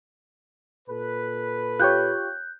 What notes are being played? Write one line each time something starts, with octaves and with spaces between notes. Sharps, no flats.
A#2 A4 B4
F4 G4 C#5 F#6 G6